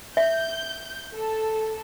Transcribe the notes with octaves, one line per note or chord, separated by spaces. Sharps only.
E5 G6
A4